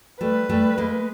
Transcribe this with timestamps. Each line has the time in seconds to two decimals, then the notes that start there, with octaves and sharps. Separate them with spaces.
0.21 G3 A3 B4
0.49 G3 A3
0.78 G#3 A#3